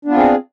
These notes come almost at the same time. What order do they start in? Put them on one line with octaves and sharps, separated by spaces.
D4 B3 F4 C4 G#4